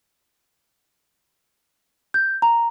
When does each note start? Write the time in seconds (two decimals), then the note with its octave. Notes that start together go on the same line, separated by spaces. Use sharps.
2.14 G6
2.42 A#5